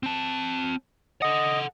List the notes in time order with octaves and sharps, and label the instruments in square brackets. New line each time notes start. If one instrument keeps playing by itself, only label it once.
[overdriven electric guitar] C4 A5
[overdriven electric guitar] A4 F#5 [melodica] D#5